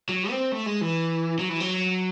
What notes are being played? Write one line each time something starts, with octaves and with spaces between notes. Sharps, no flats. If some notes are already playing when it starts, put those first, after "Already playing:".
F#3
C4
A3
G#3
E3
F#3
E3
F#3